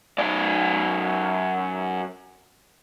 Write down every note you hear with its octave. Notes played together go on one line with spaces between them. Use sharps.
F#2 D5